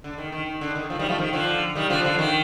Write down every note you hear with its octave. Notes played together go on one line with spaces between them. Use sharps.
D3
D#3
D#3
D#3
D3
D#3
D3 F3
D#3 G3
F3 A3
D#3
D3 F3
D#3 G3
D3 F3
D3 F3
D#3